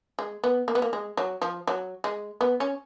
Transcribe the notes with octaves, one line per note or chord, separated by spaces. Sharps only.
G#3
B3
A#3
B3
A#3
G#3
F#3
F3
F#3
G#3
B3
C#4